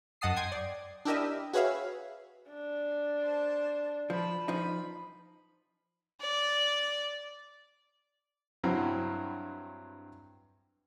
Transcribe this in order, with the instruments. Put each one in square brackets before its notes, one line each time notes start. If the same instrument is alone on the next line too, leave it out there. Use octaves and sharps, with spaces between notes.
[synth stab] F#2 D#5 F#5 A5 D#6 C7
G5 C6 D#6 G#6
D5
D4 E4 G4 A#4 D#5 E5
F#4 G#4 B4 C#5 E5 F5
[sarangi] D4
[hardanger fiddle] C5 A5
[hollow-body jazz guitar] F3 [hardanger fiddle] B4 A5
[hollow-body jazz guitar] F3 D#4 [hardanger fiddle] B5
[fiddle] D5
[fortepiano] G2 F#3 C4 E4